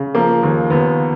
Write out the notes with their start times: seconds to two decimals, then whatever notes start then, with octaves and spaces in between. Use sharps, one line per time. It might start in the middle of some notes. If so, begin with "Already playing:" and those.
Already playing: C#3
0.15 F3 A#3
0.43 D#2
0.70 D#2 B3